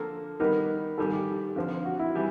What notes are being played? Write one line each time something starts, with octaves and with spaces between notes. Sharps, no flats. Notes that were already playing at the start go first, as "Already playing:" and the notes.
Already playing: D3 F3 A#3 A4
D#3 G3 B3 D#4 A#4
G#2 D#3 G3 A4
G4
F2 D3 F3
F#4
E4
E3 G3